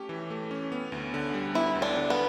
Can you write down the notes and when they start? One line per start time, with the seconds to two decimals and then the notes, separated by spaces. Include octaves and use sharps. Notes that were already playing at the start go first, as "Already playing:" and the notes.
Already playing: A3 C#4 G4
0.09 E3
0.30 A3
0.51 C#4
0.72 B3
0.92 D2
1.14 D3
1.34 G3
1.55 B3 E4
1.75 D2
1.82 D4
1.97 D3
2.10 B3